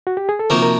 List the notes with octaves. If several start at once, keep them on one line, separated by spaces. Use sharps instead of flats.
F#4
G4
G#4
A4
C3 F3 A#3 D#4 F#4 A#4
A#4